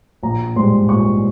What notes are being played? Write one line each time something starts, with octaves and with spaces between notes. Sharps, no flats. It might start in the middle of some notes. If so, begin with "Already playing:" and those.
A#1 A#5
G#2 G3 C6
A#1 C#6